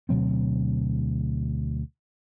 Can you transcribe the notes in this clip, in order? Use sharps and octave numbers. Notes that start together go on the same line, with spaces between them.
D2 B2 F#3 C4